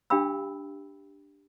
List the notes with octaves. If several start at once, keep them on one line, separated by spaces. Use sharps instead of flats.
D4 G4 F5 G5 B5 E6